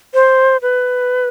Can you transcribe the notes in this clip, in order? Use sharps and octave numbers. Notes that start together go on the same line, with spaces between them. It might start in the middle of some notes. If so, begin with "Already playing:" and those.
C5
B4